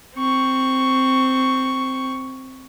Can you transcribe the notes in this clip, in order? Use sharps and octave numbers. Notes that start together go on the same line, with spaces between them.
C4 C#6